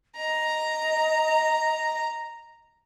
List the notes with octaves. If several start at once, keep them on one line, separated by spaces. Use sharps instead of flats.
D#5 A#5